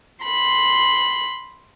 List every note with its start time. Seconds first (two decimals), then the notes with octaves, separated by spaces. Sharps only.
0.24 B5 C6